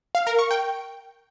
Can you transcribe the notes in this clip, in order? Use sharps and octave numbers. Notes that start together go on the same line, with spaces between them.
F5
A#4
C#6
G5